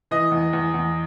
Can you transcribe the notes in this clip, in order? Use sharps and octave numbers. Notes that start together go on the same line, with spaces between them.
E3 D#5
E2
E2
E2